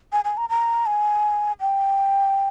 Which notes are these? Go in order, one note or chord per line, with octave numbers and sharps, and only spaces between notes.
G#5
G#5
A#5
A#5
G#5
G5